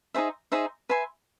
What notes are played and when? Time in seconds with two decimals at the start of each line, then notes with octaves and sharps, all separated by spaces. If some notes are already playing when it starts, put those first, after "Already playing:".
0.14 D#4 G#4 C5 E5
0.52 D#4 G#4 C5 E5
0.89 B4 E5 G#5 C6